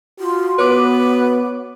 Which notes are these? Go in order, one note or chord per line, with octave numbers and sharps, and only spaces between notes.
F4 F#4
B3 B4 C#5 D6